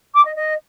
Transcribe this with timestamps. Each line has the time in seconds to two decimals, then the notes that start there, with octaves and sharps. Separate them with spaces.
0.14 D6
0.25 D#5
0.36 D#5